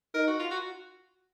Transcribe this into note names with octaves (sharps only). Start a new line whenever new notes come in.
D#4 A#4
F#4
F4
F#4